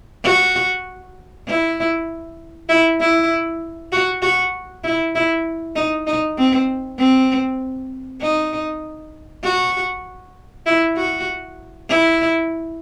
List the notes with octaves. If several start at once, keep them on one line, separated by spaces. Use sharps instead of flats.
F#4
E4
E4
E4
F#4
F#4
E4
E4
D#4
D#4
C4
C4
D#4
F#4
E4
F#4
E4